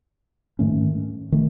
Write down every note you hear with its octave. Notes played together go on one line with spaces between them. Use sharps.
G#2 D#3 A3 C#4
D#3 A3